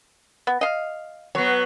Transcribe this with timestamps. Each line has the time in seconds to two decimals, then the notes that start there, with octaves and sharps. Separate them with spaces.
0.47 B3
0.61 D#5 F5
1.35 F#3 B3 C#5